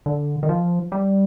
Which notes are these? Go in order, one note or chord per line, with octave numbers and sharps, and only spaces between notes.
D3
D#3
F3
G3